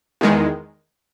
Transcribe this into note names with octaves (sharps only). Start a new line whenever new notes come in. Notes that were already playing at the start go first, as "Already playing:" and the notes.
E2 D#3 G#3